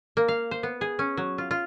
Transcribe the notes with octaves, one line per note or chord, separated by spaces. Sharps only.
A#3
F5
C5
B3
G#4
C#4
F#3
F4
F4